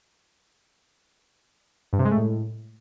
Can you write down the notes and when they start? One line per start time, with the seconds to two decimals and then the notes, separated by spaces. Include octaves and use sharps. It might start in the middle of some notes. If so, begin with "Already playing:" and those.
1.93 G2
1.99 C3
2.05 G#3
2.11 A3
2.17 A2